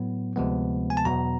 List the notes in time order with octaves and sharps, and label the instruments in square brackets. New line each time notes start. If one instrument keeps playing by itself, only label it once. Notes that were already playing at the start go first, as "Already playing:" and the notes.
Already playing: [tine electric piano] A2 F#3 B3
D2 C3 F3 G#3 B3
G#5
A5
E2 B2 F#3 B3 A#5